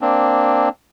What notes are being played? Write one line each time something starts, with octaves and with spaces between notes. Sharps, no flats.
A#3 C4 D4